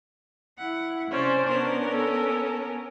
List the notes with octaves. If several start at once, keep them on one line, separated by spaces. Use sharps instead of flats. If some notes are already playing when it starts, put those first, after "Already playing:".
E4 F#5
C3 C#4 C5 D5
B3 C#4 D4 A#4
A4